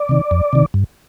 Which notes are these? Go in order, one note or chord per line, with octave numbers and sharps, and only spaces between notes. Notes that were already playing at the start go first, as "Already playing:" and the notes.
Already playing: D5
C3 D#3
F2
C3 D#3
G2